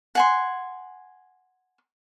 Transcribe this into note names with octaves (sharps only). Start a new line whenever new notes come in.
F#5 G#5 C6